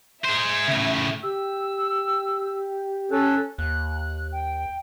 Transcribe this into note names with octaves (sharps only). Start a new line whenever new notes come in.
G#4 C5 E5
A2 C#3
G4 E6
C#4 A4 F#6
D#2 F#6
G5